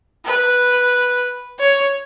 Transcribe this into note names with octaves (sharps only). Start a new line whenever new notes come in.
B4
C#5